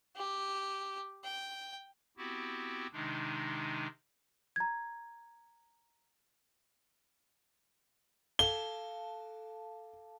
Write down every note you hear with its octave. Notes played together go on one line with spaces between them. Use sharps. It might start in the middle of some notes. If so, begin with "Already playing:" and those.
G4
G5
B3 C4 E4 F#4 G4
C3 D#3 G#3 D4 D#4
A#5 G#6
A4 F5 A5 G7